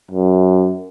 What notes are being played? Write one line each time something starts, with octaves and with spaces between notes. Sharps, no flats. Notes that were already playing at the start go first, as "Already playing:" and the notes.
F#2